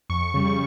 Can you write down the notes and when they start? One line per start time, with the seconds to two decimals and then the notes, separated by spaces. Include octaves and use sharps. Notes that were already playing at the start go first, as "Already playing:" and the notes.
0.10 F2 C#6
0.34 C#3 G3
0.48 C#6